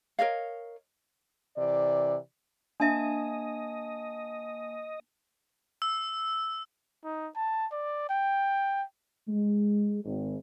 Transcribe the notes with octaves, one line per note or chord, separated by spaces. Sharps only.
A#4 C#5 D#5 F5
C3 E3 D5
A#3 D4 D#5 E5 G#5 A5
E6
D#4
A5
D5
G5
G#3
G#1